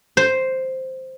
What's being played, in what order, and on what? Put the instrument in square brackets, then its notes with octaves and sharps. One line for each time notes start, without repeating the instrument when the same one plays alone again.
[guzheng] C5